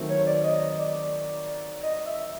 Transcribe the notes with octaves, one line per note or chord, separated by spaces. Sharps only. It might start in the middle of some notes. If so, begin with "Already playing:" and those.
Already playing: D#3 F#3 A3 C4
C#5
D5
D#5
D5
D#5
E5